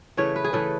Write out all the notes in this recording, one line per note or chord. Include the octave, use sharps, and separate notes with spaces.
C#3 E3 A3 C#5
B4
G#4
C#3 E3 A3 A4